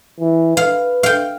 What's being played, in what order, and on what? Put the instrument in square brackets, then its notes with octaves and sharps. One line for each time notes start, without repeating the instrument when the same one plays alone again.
[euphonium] E3
[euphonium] B4 [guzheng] F5
[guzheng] F5 G5